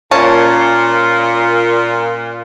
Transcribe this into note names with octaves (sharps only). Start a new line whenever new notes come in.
A#2 C#4 A5